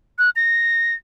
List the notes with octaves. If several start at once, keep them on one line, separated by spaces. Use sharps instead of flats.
F#6
A#6